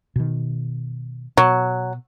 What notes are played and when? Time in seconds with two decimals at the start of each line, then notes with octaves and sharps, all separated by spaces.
0.16 B2 D#3
1.37 B2 F#3